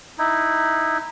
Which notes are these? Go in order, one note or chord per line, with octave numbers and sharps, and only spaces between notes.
D#4 E4